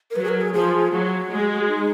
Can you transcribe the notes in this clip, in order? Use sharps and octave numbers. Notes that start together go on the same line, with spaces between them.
A#4
F#3 B4
G#4
A#4
G#4
F3 G#4
F#3 F#4
G#3
D#4